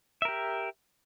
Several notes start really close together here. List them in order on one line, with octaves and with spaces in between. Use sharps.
E5 A#4 G4